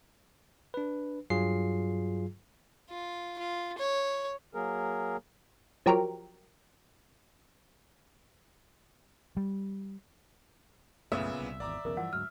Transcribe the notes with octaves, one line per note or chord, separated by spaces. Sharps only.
D4 B4
G2 F#3 F4 G#4 C7
F4
F4
C#5
F#3 A#3 G#4 A#4
F3 F#3 G4 A#4
G3
B1 F#2 A#2 C#3 A3 B3 E5
C2
G#1 E2 D5 A#5 D6
B1 E2 C#3 A#4
G2 E3 F3 F#5
D2 G#2 F#3 F6